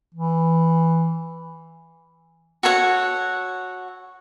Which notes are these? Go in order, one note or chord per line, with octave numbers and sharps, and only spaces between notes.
E3
F#4 A4 C#5 F#5